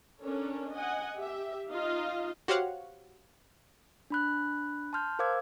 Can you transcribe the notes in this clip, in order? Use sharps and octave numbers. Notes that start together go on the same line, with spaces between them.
C#4 D4 A4 A#4 C#5
D#5 F#5 G#5
G4 E5
D#4 F4 D#5 F5
F#4 G4 C5 C#5 F5 F#5
D4 B5 F#6
A5 C6 F6 G6
A#4 C5 F5 D6 E6 G#6